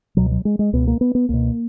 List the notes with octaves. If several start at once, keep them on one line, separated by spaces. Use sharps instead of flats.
C#2 B2 F#3
F#3
G#3
G#3
C#2 B2 B3
A#3
B3
B3
C#2 B2 A#3